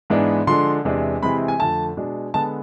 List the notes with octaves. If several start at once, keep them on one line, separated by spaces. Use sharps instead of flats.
G#2 E3 G#3 B3 D4
D3 F3 G#3 D4 C6
E2 C3 E3 G#3 D4
C3 E3 G#3 C4 B5
G#5
F2 D3 A3 A5
B2 G#3 D4
D3 G#3 B3 A5